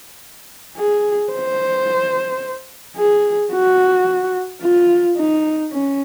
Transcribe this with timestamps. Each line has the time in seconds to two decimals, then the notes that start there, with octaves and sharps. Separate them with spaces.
0.77 G#4
1.33 C5
2.97 G#4
3.52 F#4
4.61 F4
5.17 D#4
5.72 C#4